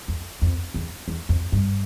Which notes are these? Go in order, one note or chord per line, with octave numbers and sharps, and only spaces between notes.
F2
F2
E2
E2
F2
G2